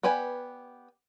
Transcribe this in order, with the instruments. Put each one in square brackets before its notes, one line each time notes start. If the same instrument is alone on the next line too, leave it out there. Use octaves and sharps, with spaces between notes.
[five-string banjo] B3 G4 B4 D5 G#5